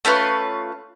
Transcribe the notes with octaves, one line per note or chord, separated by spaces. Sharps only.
A3 C#4 F4 B4